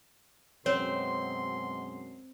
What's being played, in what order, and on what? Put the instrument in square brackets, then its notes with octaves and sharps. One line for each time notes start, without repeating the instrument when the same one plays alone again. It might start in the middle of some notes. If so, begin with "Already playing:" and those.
[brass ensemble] F#2 B2 G#3 [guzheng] C4 [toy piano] C#5 [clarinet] C6